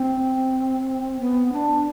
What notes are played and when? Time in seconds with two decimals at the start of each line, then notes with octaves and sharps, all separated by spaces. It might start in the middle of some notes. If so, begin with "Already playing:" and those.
Already playing: C4
1.19 B3
1.53 D4